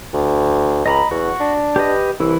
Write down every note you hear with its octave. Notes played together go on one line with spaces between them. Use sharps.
D2
C#2 D#5 A#5 B5
E2 F#4
D4
G4 B4 D#5
C2 E3 E4